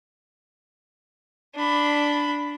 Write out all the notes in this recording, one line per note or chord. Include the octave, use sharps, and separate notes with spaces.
D4 B5